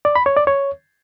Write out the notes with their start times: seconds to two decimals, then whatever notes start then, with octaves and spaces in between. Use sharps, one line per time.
0.05 D5
0.16 B5
0.26 C#5
0.37 D5
0.47 C#5